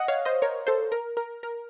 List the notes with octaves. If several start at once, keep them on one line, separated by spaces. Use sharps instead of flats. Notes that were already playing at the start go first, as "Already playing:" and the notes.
Already playing: D#5 F#5
C#5 F5
C5 D#5
A#4 C#5
A4 C5
A#4
A#4
A#4